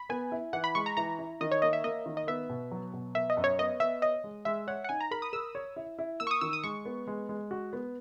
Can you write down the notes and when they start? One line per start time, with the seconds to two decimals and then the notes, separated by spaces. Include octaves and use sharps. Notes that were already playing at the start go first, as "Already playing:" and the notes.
Already playing: B5
0.10 B3 G#5
0.32 E4
0.53 E3 F#5
0.64 B5
0.75 G#3 C#6
0.86 A#5
0.97 E3 A#5
1.19 E4
1.41 D#3 D#5
1.51 C#5
1.62 A#3 D#5
1.73 E5
1.84 A#3 D#5
2.06 D#3
2.17 D#5
2.27 B3 E5
2.50 B2
2.71 F#3
2.93 B2
3.15 B3 E5
3.30 D#5
3.37 F#2
3.44 C#5
3.59 B3 D#5
3.80 B3 E5
4.02 C#5 D#5
4.24 G#3
4.45 G#3 E5
4.67 C#5 F#5
4.84 F#5
4.89 D#4 G#5
5.01 A#5
5.11 A#4 B5
5.22 D#6
5.33 A#4 E6
5.55 C#5
5.76 E4
5.99 E4
6.20 A#3 E6
6.27 C#6
6.31 D#6
6.41 D#3 E6
6.53 D#6
6.63 G#3 C#6
6.85 B3
7.07 G#3
7.29 G#3
7.51 F#4
7.73 B3